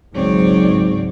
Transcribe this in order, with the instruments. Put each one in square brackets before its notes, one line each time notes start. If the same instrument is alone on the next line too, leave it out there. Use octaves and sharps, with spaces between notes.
[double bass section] G#1 C#2 F#3 [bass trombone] G#2 [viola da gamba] C4 C#5 D5